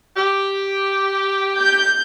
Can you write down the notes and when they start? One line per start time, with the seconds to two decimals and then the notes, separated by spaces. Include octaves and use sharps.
0.17 G4
1.57 G6